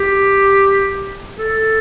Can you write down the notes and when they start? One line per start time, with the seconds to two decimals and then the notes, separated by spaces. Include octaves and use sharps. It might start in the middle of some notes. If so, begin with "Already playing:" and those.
Already playing: G4
1.39 A4